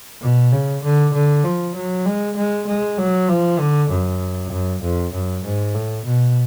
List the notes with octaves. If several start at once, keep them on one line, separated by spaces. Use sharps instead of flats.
B2
C#3
D3
D3
F3
F#3
G#3
G#3
G#3
F#3
F3
D3
F#2
F#2
F2
F#2
G#2
A2
B2